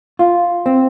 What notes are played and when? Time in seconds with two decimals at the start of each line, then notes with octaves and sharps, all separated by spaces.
0.19 F4
0.66 C4